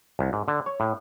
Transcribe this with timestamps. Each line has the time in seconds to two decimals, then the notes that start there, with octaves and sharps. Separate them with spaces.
0.19 C2
0.33 G#2
0.48 D3
0.66 C#5
0.80 A2